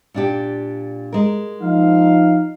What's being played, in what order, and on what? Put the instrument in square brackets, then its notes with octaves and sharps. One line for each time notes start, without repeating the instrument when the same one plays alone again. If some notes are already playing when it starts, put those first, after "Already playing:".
[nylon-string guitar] A#2 D4 G4
G#3 A#4
[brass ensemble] F3 D#4 F5